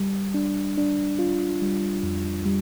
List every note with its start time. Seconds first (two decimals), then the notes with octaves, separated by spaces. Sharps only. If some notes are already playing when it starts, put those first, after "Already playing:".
Already playing: G3
0.34 D4
0.78 D4
1.19 F4
1.62 G3
2.03 F2
2.46 G3